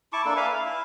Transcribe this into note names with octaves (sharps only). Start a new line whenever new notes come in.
E4 A5 C#6 D6
A#3 D4 A4
B4 E5 F5 G#5
F5
E4